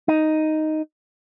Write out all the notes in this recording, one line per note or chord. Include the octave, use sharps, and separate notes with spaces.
D#4